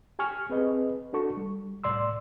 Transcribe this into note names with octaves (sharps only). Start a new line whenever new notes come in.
G4 G#5 C#6 F6
C4 G#4 B4 D#5
D4 F#4 A4 C#6
G3
C2 A2 D5 C6 E6